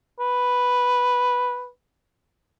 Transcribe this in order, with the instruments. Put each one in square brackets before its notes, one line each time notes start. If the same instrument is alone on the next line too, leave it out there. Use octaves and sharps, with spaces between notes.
[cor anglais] B4